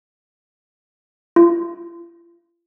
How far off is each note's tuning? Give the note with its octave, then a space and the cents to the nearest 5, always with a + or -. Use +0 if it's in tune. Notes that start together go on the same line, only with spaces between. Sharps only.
F4 -40